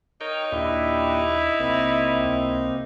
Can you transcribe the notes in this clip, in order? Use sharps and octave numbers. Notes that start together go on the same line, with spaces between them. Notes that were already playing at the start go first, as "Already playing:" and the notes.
D#4 A#4 C#5 G5
D#2 A#2 D4 E4 G4
B1 C3 A#3 C4
C#2